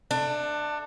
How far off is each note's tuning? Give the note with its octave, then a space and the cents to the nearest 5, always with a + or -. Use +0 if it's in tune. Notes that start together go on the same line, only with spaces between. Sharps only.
A3 +0 D4 +20